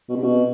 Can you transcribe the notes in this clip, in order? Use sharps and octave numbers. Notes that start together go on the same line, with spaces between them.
B2
C3
B2